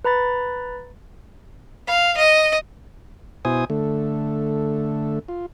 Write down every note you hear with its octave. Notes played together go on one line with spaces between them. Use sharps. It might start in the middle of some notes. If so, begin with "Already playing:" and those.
B4 A#5 B5 A6
F5
D#5
B2 E4 C5 G#5 D#6
D3 A3
F4